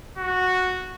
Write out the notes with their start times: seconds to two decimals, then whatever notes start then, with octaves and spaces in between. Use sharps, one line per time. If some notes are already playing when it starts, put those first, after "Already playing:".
0.18 F#4